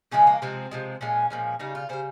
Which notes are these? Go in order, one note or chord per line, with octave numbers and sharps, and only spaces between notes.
C#3 F3 G#3 C#4
A#3
C3 F3 G#3 C4
C3 F3 G#3
A#2 F3 G#3 C#4
A#2 F3 G#3
C#3 G3 D#4
F4
C#3 G3 C5